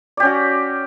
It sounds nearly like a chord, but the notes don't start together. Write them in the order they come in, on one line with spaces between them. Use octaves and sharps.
D5 G4 C#4 F#4